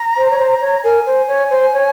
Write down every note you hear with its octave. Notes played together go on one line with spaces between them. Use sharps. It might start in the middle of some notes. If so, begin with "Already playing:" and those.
Already playing: A#5
C5
C#5
C5
C#5
A#4 G#5
C5
C#5
C5
C#5